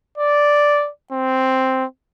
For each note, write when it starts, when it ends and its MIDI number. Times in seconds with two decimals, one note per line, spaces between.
0.18 0.90 74
1.12 1.85 60